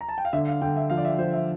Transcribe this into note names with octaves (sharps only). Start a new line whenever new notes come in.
A#5
A5
G5
F5
D3 E5
F5
D3 G5
E5
F3 F5
D5
E5
F3 C5
E5